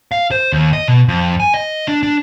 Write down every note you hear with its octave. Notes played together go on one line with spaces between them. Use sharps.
F5
C5
D#2
D#5
B2
F2
G#5
D#5
D4
D4